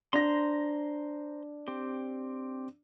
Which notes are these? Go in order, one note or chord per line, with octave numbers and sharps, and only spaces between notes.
D4 C5 A#5 C6 A#6
C4 G4